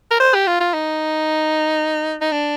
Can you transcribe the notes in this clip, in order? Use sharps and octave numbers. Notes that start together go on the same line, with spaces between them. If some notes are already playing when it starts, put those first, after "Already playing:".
A#4
C5
G4
F4
F4
D#4
D#4
D4